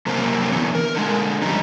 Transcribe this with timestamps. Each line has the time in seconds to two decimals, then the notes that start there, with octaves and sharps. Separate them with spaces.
0.06 F#2 C3 A#3 C4
0.53 D3 E3 B3
0.75 A#4
0.95 D3 G#3
1.42 F2 G3 D#4